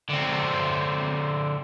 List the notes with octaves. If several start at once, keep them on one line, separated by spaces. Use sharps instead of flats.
D3 C4